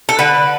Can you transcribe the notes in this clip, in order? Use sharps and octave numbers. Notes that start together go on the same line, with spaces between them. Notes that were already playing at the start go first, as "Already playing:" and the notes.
A4
D3 B4